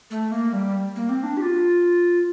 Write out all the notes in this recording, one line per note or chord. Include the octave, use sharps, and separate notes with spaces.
A3
A#3
G3
A#3
C4
D4
G4
F4